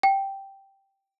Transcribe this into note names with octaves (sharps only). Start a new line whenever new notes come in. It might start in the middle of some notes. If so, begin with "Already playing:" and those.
G5